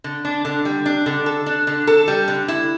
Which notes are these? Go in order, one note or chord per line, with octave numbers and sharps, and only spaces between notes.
D3
D4
D3
G3
D4
D3
A4
D4
D3
A4
G3
D3
E4